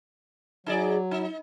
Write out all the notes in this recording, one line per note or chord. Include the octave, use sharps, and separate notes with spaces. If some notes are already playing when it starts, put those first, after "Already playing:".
F#3 D#4 G#4 D5
D#4